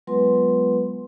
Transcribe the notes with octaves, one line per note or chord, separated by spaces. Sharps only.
F#3 G#3 B3 F4 B4 C6